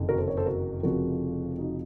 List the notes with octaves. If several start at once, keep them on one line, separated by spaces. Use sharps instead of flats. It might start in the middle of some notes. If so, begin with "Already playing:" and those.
Already playing: F#1 F2 C3 D#3
F#4 A#4
A4 C5
A#4 C#5
A4 C5
F#4 A#4
F1 F2 C#3 F3 F#4 A#4
D#4 F#4